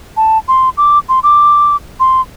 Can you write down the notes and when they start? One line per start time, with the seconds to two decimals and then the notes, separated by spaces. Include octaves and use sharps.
0.17 A5
0.48 C6
0.77 D6
1.09 C6
1.23 D6
2.00 C6